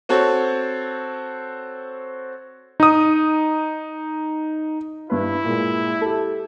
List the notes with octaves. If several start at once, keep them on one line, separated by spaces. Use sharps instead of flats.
C4 F#4 A4 C#5
D#4 D#6
G2 E4 B4
A#2 G#3
G4 A4